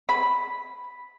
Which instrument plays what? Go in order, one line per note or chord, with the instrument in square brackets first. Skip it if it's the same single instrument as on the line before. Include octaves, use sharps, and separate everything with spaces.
[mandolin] B5